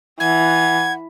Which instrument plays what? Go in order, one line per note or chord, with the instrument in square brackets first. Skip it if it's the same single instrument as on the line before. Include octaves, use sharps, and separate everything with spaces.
[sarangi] E3 [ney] F#5 [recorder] G#6